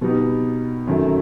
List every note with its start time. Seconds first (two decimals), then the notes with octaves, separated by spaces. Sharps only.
0.01 B2 G3 B3 D#4
0.87 F#2 D#3 F#3 A3